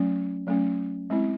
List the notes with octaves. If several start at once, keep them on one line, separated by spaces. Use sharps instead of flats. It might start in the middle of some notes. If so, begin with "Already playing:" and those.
Already playing: F#3 A3 C#4
F#3 A3 C#4
G#3 C4 E4